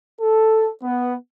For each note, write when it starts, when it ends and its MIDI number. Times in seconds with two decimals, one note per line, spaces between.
0.20 0.71 69
0.83 1.15 59